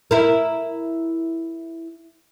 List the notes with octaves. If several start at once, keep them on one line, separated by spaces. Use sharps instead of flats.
E4 A#4